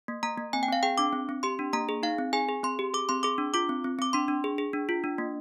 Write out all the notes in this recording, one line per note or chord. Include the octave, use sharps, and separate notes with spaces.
A#3
A#3 A#5
A#3
C4 G#5
G5
C4 F5
G#4 G5
D4 D6
C4
C4
G4 C6
D4
A#3 A#5
G#4
D#4 F5
C4
G#4 G#5
G#4
C4 C6
G4
G#4 D6
C4 C6
G#4 D6
D4
F4 D6
C4
C4
C4 D6
D4 C6
D4
G#4
G#4
D4
F4
D4
A#3